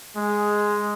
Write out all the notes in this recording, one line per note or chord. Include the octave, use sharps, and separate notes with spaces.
G#3